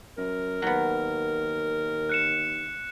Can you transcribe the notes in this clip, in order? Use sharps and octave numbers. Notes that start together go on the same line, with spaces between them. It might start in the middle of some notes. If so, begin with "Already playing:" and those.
F#2 A#4
D#2 F#3 B3
F#6 C#7 E7